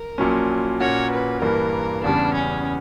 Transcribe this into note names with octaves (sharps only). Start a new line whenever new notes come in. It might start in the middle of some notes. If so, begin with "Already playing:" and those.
Already playing: A#4
A#1 A#2 F#3 C#4
A#2 A#3 C#4 F#4 C#5
B4
G2 E3 A#3 A#4
E2 C#3 G3 D4
C#4